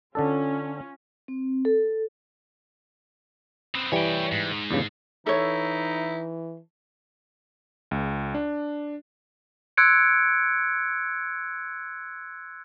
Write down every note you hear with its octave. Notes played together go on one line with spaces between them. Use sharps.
D3 C#4 D4 F4 A4
C4
A4
B3 C4
E3 G3 C#5 G5
G#2
E2 G2 C#3
E3 D#4 E4 A4 C#5
C#2
D4
C6 E6 F#6 G#6 C#7 D7